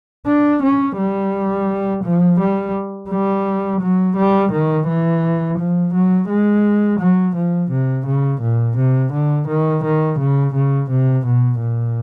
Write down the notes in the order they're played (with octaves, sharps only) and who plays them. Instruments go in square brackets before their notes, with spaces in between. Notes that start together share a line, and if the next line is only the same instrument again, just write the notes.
[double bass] D4
C#4
G3
F3
G3
G3
F#3
G3
D#3
E3
F3
F#3
G#3
F#3
F3
C3
C#3
A#2
C3
D3
D#3
D#3
C#3
C#3
C3
B2
A#2